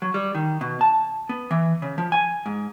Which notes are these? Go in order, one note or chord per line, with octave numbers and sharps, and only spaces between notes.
F#3
G3
D#3
B2
A5
B3
E3
C#3
F3
G#5
G#2